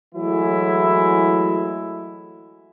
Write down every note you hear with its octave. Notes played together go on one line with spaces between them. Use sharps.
E3 F#3 G#3 A3 E4